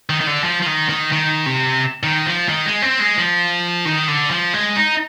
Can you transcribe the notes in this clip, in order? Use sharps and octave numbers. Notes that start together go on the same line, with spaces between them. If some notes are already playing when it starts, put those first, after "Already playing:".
D#3
D#3
D3
F3
F3
D#3
D#3
D#3
C3
D#3
F3
D#3
G#3
C4
G#3
F3
D#3
D3
F3
G#3
D#4